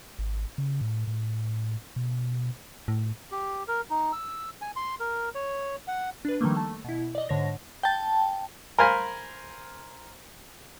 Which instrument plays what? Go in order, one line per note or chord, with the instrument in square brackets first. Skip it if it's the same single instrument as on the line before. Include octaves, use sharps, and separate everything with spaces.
[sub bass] G#1
C#3
A2
A2
B2
[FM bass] A2
[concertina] G4
A#4
D#4
E6
G#5
C6
A#4
C#5
F#5
[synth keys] D4 B4
D#3 F3 G3 A3 A#3
A3 A5
B2 E4
D5 D#5
G#2 D3 C#5 A#6
[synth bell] G5 A5
[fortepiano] A#4 C5 F5 G#5 B5